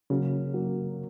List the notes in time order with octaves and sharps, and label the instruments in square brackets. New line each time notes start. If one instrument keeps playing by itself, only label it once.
[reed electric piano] C#3 [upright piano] F#3 A#3 C#4
[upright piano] F#3 A#3 C#4